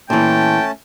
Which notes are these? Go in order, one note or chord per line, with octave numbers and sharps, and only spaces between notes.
A#2 E3 A3 C#4 G5 A5